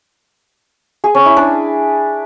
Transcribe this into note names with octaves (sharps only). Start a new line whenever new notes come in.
G#4
C#4
E4
D4